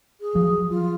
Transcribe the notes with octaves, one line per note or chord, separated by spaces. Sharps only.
G#4
F3 F#3
F4